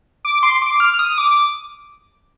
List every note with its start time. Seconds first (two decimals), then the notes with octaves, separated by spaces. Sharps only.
0.25 D6
0.43 C6
0.62 D6
0.80 F6
0.93 F6
0.99 D#6
1.18 D6